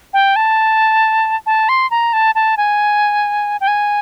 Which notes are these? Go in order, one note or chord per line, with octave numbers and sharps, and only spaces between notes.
G5
A5
A5
C6
A#5
A5
A5
G#5
G5
G#5